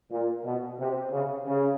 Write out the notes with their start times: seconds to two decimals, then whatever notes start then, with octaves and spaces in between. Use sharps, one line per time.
0.10 A#2
0.44 B2
0.78 C3
1.12 C#3
1.46 C#3